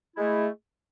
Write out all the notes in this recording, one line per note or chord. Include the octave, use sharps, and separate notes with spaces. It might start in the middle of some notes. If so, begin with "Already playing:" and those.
G#3 A3 E4